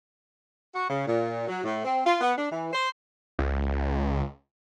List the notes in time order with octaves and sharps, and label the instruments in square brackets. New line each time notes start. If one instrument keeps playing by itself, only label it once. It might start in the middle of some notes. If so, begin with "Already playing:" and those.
[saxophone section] F#4
C#3
A#2
F#3
A2
C4
F4
B3
D4
E3
C5
[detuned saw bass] C#2